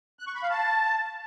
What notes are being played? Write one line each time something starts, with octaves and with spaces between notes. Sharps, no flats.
F#6
C#6
B5
F5
A5